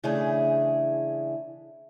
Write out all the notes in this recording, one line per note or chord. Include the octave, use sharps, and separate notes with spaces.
C#3 E3 A3 D4 E4 G#4